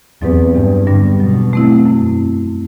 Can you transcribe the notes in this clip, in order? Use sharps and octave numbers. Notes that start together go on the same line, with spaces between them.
E2 F#3 C4 G4 B4
E2 G2
G2 D3 G3 B3 D4
B2 F#3
A3 C4 E4
F#2